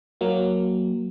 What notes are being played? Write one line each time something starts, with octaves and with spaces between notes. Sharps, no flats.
F#3 A#3